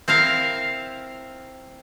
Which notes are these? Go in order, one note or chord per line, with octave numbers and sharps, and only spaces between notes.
C4 E4 A#4 F5